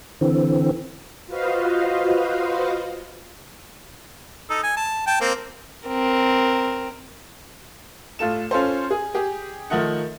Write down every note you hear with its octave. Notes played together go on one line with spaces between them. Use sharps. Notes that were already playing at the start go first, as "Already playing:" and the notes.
D3 E3 C4
F4 F#4 B4 C5 D#5 F5
D#4 A4
G#5
A5
G5 A5
A#3 C4
C4 A#4
A2 F4 A4 E7
C#4 F4 A4 C5
G#4
G4 G#4
D#3 F3 A3 D#4 F#5